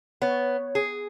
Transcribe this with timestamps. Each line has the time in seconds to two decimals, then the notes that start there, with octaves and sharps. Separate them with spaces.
0.22 B3 C#5
0.75 G#4